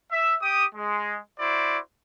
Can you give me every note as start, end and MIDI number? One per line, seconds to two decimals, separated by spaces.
0.11 0.34 76
0.42 0.65 67
0.42 0.65 87
0.75 1.17 56
1.39 1.79 64
1.39 1.79 66
1.39 1.79 72
1.39 1.79 74